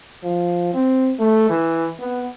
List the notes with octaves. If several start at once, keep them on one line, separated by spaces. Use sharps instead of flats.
F3
C4
A3
E3
B3